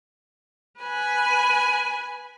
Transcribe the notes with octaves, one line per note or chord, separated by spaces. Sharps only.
B4 G#5 B5